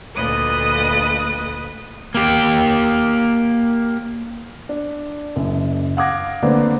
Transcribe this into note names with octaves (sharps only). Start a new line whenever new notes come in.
D2 A#2 B4 D#5 D#6
A#3 G4
D4
F#1 F#2
F5 F#5 D6 D#6 G#6 A#6
D3 A3 A#3 C4 D4 B4